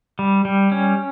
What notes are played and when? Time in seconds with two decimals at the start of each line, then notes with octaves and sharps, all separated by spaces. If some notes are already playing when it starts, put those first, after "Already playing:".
0.19 G3
0.45 G3
0.72 C#4